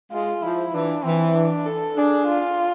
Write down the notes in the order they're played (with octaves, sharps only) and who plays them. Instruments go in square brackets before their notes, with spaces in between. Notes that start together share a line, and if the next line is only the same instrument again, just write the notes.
[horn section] G#3 [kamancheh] F4
[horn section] F3 [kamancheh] E4
[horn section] E3 [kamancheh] D4
[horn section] E3 [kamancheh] C4
[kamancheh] D4
A4
[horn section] D4 [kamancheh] G#4
[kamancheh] F4